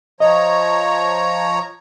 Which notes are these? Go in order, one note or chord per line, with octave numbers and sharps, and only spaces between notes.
F3 C#5 D#5 A#5